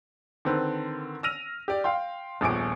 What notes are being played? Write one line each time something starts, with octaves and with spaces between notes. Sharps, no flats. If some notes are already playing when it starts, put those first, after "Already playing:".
D3 D#3 C4 B4
E6 F6 A#6 D#7 F7
G4 D5
F5 G5 C6
D#1 A#1 B3 G#5 D6 D7